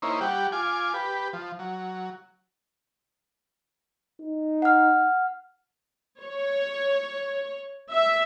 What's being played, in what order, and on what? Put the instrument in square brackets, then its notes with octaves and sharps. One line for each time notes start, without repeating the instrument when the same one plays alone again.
[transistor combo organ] A#3 C#4 D#4 E4 C5
G3 G4 F#5
F4 G#5 D6
G4 B4
F3
F#3
[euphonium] D#4
[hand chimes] F#5 F6
[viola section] C#5
E5